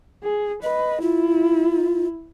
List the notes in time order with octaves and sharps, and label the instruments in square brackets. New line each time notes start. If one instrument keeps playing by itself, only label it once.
[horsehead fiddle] G#4
[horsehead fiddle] B4 [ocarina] D#5
[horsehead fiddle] E4 [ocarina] F4